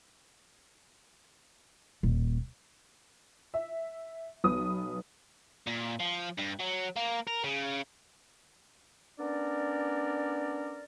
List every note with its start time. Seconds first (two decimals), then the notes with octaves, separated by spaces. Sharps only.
2.03 D#1
3.54 E5
4.44 B1 B3 D#6
5.67 A#2
6.00 F3
6.38 G2
6.60 F#3
6.96 A#3
7.27 A#4
7.44 C#3
9.19 B3 C#4 D4 A#4 D5